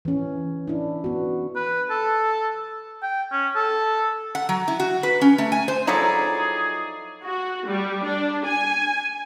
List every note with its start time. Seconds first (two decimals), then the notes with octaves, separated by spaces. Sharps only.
0.05 E3 C#4
0.68 D4 E4
1.04 B3 F#4
1.56 B4
1.90 A4
3.03 G5
3.32 C#4
3.56 A4
4.35 F#5
4.49 F#3
4.68 E4
4.80 F#4
5.03 B4
5.21 C#4
5.38 A3
5.52 G#5
5.68 C5
5.87 F3 F#3 D#4 E4 G#4 A4 D5
7.24 F#4
7.67 G3
8.05 D4
8.46 G#5